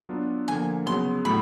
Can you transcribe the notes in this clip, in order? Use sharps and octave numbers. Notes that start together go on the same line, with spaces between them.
F#3 B3 D4 F4
D3 F3 A#3 G#5
C#3 F#3 B3 C6
A2 F#3 A3 B5